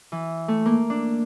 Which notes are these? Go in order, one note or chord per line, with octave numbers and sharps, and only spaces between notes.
E3
A3
A#3
D4